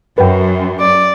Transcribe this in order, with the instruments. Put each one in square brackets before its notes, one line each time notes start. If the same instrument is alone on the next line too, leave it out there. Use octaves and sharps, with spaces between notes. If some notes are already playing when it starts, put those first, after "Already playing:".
[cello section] F#2 [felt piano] B4 G5
[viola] D5